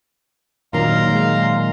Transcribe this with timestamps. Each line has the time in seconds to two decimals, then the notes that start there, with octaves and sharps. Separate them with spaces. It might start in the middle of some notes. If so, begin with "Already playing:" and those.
0.73 A#2 D#3 F#3 D#4 A#4 F5 A#5 C6
1.09 G#3